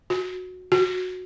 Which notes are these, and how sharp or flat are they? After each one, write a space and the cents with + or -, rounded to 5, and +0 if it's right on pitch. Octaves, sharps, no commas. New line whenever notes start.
F#4 -15
F#4 -10